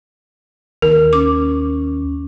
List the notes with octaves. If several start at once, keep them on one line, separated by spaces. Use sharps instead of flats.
D#2 A#4
C#4 D6